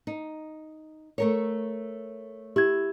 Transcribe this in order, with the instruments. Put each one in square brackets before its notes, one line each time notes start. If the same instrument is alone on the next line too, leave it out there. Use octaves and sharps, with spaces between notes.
[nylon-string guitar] D#4
A3 A#4 C#5
[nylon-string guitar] E4 [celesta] G4 G#6